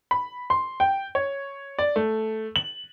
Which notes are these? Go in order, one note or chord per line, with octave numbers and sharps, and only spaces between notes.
B5
C6
G5
C#5
D5
A3
F#7